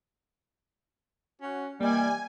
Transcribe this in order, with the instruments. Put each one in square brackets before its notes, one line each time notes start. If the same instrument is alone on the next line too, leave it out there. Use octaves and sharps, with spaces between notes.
[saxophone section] C#4 F#4
[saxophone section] E3 G3 [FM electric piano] A#3 D#5 [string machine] G#5